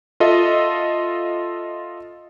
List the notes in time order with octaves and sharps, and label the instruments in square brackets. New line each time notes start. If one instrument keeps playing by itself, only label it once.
[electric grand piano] F4 A4 D#5 E5